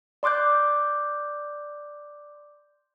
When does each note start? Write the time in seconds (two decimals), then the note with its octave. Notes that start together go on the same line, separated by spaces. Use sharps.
0.23 D5 C6 D6 F#6 G6